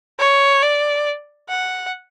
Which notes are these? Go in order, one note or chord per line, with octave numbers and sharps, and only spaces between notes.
C#5
D5
F#5